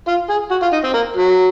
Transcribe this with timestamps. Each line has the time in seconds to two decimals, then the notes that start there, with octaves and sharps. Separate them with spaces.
0.08 F4
0.30 G#4
0.51 F#4
0.62 F4
0.73 D#4
0.84 C4
0.94 A#3
1.16 F#3